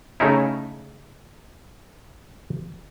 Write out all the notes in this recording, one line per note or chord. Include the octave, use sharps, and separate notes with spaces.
C#3 A3 C#4 D#4 E4